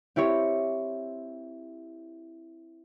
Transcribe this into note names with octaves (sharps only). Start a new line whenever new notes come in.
C4 E4 G4 C#5